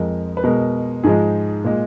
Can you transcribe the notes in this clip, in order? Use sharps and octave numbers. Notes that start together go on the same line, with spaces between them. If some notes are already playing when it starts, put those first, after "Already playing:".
Already playing: F2 F3 G#3 A#4
B4
B2 G#3 A#4
G#2 F3 G#3 G#4
A#2 G#3